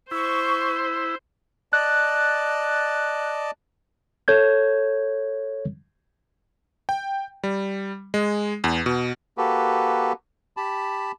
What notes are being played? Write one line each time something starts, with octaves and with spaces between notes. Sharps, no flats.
E4 C5 C#6
D5 D#5 A5 F#6
A4 C#5 G6 G#6
G5
G3
G#3
E2
B2
A#3 F#4 G4 A4 B4
G4 A5 B5